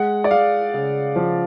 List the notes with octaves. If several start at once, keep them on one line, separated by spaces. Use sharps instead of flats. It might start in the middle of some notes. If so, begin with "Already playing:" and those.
Already playing: G#3 F#5
D5
G#3 F5
C#3
F3